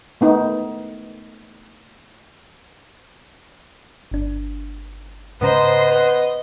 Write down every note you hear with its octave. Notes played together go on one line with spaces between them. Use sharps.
A3 B3 D#4
G1 D4
G#2 C#3 B3 C5 D#5 A#5
B4 F#5